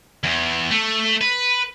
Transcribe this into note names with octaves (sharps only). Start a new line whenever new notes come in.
E2
A3
B4